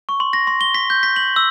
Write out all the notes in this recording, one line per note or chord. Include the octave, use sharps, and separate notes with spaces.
C#6
C6
A#6
C6
G7
B6
G6
B6
F#7
E6